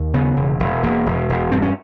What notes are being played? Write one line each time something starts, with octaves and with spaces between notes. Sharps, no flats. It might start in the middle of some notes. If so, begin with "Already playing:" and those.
Already playing: D#2
C#3 B3
E1
E1
E1 A#3
E1
E1
G2 C4
C#4